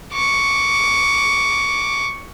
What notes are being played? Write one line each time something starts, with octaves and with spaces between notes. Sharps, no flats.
C#6 D6